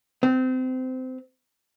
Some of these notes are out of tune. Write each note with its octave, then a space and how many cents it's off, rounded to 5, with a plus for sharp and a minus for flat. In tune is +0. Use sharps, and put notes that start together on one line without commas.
C4 -25